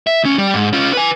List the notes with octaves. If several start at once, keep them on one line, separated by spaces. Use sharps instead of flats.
E5
D2 C#4
G3
G#2
C#4 F4
B4 G#5